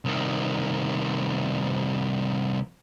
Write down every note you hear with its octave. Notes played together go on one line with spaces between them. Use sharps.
C2 D#3